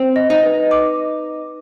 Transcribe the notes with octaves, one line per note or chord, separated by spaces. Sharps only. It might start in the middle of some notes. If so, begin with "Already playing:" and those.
Already playing: C4
D#5
D#4
B4
D6